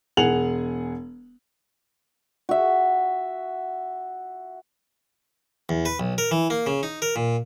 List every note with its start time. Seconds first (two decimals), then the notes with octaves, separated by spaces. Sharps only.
0.17 E1 G#4 F#5 G#5 F7 F#7
2.49 F#4 E5
5.69 E2
5.85 B4
6.00 B1
6.18 A#4
6.31 E3
6.50 A#3
6.66 C#3
6.83 D#4
7.02 A#4
7.16 A#2